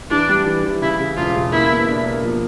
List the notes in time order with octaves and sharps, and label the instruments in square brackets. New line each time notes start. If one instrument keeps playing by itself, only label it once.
[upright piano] E3 [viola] D4
[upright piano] G3
E3
E3
[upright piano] C#3 [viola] E4
[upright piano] C#3
[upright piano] E1 [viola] F4
[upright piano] C#3
[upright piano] A#3 [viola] E4
[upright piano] B2
D4
A#3
F3